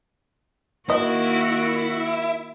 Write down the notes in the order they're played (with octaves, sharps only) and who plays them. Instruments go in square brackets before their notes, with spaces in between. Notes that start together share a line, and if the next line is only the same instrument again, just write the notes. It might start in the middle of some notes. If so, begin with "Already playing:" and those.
[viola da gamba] D#3 A#3 F#4 [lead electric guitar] E4 [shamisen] D#5